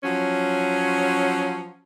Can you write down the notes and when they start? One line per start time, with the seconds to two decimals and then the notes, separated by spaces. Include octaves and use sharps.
0.04 F3 F#3 C#4